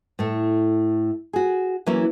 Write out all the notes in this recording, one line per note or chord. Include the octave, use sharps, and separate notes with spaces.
A2 A3
F#4 G#4
E3 F#3 A#3 C#4 E4